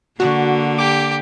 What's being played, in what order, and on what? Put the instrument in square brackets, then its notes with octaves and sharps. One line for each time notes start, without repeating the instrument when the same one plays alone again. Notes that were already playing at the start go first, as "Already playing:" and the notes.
[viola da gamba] D3 A#3 [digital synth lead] F#4
[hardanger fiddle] G4 [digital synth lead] D6